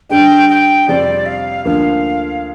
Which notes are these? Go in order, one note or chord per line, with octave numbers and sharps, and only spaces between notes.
G2 D3 G3 D4 G5
G5
F2 C3 G3 C4 G4 D5
F5
D2 D3 F3 A#3 F5